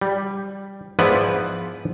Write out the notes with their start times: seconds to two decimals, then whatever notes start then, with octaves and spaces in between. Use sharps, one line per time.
0.01 G3
0.99 G#2 F3 B3 E4 B4 D5